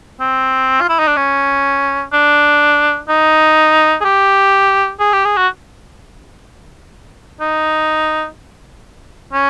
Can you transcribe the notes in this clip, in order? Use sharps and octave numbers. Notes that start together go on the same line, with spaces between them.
C4
F4
E4
D#4
D4
C#4
D4
D#4
G#4
G4
G#4
G4
G#4
F#4
D#4
C#4